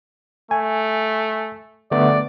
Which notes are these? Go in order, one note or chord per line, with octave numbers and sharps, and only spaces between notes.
A3 G#5
D3 A3 B3 D5